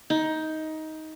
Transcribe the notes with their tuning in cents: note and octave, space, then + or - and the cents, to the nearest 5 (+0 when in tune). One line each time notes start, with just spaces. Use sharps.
D#4 +15